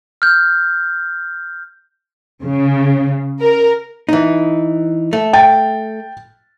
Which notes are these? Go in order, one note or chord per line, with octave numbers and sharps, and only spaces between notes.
F6 G6
C#3
A#4
E3 D#4
A3
G5 A6